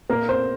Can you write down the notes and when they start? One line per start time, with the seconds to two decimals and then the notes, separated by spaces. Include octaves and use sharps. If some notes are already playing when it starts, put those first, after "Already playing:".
0.10 A#2 A#3 A#4
0.29 C5